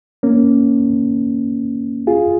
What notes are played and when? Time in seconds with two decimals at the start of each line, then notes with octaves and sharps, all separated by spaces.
0.23 A#3 C#4
2.07 F4 G#4